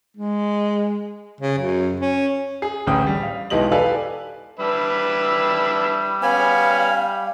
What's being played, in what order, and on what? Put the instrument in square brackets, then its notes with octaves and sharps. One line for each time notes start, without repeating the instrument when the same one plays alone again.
[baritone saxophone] G#3
C#3
F#2
C#4
[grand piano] G#4
A1 D2 C#4 G5 D#6
G3
F5
B1 E3 G#3 G4 D#5 F#7
G4 A4 B4 D5 F5 G#5
[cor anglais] G3 [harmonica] D4 B4 E5
[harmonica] B3 C#4 F6 [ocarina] F5 [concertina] G#5 B5